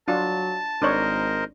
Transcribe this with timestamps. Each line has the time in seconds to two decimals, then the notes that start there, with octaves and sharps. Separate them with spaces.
0.08 F#3 D4 F4 A5
0.82 G#1 D4 A#4 C5 C#5 D#5